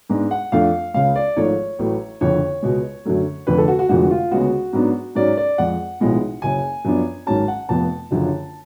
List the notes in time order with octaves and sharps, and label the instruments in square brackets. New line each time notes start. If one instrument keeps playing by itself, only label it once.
[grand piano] G#2 G#3 B3 D4
F#5
F2 F3 A3 D4 F5
C#2 C#3 G#3 F5
D5
G#1 G#2 F3 A3 C#5
A1 A2 F#3 A3
F#1 F2 D3 C#5
C#2 B2 G#3
F#2 D3 F#3 A3
F1 F2 D3 B4
A4
F#4
F#4
F1 F2 D3 F3 G#3 F#4
F4
D2 C#3 G#3 B3 F#4
G#2 F#3 B3 D4
G#2 F#3 C#4 D5
D5
F2 F3 G#3 F#5
B1 A2 F3 G#3 B3
F#1 F#2 C#3 G#5
F#2 F3 B3 D4
G#1 G#2 F#3 C#4 A5
F#5
F1 F2 F3 B3 A5
F#1 F#2 D3 F3